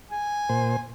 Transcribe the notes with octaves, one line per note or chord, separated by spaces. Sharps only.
G#5
A#2 C5